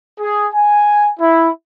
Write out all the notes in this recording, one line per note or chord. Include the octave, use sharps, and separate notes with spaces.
G#4
G#5
E4